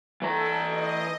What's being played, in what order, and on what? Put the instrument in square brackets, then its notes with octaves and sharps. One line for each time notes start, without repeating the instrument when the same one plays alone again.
[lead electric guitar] E3 A#5 [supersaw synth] A4
[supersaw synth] D#5